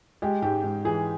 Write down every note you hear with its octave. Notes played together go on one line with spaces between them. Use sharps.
G#3 G4
G#2 G4
G#2
E3 G#4